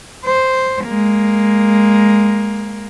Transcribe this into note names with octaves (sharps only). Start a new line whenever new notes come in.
C5
G#3 A#3